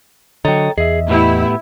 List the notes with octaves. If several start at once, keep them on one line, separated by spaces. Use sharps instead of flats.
D3 F#3 A4 C#5 D#5 G5 A#5
E2 G#4 D#5 E5
A2 B3 E4 G4